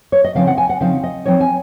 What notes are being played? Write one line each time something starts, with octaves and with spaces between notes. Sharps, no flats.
C#5
D#5
C#3 F3 C4 D#4 F5
F#5
G#5
F#5
C#3 F3 C4 D#4 F5
D#5
F3 C4 D#4 C#5
G#5